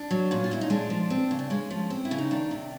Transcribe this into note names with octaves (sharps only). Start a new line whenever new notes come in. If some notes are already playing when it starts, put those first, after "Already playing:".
Already playing: D4
F#3
A#2 C#4
F4
A#2 E4
D#4
G#3 D4
F3
C4
C#3
D4
G#3 C#4
F3
C4
E4
C#3
D#4
D#3 D4
C3